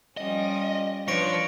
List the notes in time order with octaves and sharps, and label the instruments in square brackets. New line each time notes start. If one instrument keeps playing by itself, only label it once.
[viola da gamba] F3 G3 C#4 [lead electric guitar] D#5
[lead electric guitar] F3 [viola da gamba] D4 B4 C#5 [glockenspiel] C#6 A#6 D7